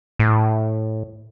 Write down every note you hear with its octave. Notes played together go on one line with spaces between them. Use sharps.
A2